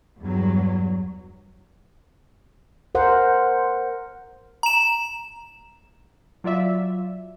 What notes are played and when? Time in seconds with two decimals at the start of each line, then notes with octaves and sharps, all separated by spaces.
0.19 E2 G2 F#3
2.95 A#4 C5 F#5
4.63 A#5 E7
6.44 F#3 F4 D5 E5